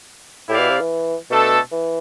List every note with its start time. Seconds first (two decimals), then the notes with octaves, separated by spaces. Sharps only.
0.49 A2 E4 G4 D5 F5
0.59 B2
0.70 C3
0.80 E3
1.30 B2 A3 D4 A4
1.72 E3